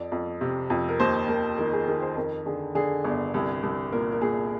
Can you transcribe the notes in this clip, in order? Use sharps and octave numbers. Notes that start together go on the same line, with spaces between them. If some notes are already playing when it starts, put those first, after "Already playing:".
Already playing: F2 D5
F2
C3
F2
A#4
D#2 C5
D#2 A#4
D#3 A#4
G#4
D#3 A#4
C5
F2 A#4
D3 G#4
D3 G#4
G1
C2
C2
A#2 A#4
A#4
A#2 G#4